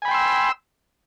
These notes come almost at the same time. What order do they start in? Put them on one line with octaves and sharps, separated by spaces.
G#5 B5 G5 C6 E6